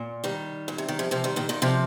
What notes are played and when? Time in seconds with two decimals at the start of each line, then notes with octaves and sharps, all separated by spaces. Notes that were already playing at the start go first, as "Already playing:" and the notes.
Already playing: A#2
0.24 D#3 G3
0.68 A#2
0.78 C3
0.88 D#3
0.99 C3 F3
1.11 C3 F3
1.24 D#3 G3
1.36 A#2 D#3
1.49 A#2 D#3
1.62 C3 F3